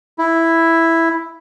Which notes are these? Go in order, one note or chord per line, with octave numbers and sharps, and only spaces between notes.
E4